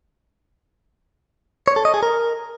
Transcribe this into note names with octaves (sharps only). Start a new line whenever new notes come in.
C#5
A4
D#5
G#4
A#4